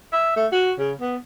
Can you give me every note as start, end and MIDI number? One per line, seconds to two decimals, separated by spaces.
0.13 0.34 76
0.36 0.47 57
0.52 0.72 66
0.79 0.93 49
1.01 1.17 59